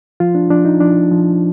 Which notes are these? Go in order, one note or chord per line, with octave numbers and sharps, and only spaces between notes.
F3 F4
D4
F3 D4
D#4
F3 D4
F3